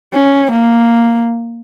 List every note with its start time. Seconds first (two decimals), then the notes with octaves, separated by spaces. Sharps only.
0.14 C#4
0.51 A#3